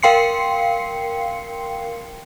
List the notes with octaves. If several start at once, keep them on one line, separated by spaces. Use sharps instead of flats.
A#4 F5 G5 C6 C7 C#7